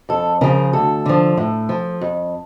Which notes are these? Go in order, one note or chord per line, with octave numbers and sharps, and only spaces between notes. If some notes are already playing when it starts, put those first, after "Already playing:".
F2 A4
C#3 F3 A#4
D2 A4
D3 F3
A2
F3
F2